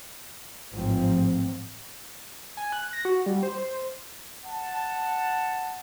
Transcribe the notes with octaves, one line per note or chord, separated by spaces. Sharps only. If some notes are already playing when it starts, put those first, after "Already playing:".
A1 G#2 F3 C4
G#5
F#6
A#6
F#4
G3
C5
C5
F#5 A5